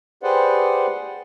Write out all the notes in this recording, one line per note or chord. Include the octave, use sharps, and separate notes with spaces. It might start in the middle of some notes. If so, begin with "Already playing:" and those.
G4 G#4 B4 C5 D5 F#5